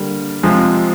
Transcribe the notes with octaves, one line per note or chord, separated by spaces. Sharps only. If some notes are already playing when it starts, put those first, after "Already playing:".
Already playing: D3 G3 A#3
C3 F3 G#3